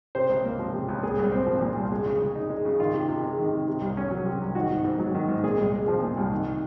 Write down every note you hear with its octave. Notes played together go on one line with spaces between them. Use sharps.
C3 C5
C#2
A#3
F3
C3
C#2
A#2 G#4
C2
C4
F3
A#2
C2
G#3
C#3
C#3
D#4
G#3
C#3
D#3 F4
C3
C3
G#3
D#3
C3
C3
C2
C#4
F#3
C3
C2
D#3 F#4
G#2
G#2
F#3
D#3
G#2
A#2 G#4
C2
G#3
F3
A#2
C2
D#3